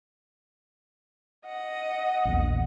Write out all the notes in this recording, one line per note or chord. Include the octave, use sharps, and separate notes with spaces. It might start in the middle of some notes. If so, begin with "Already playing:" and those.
D#5 F#5
A#1 E2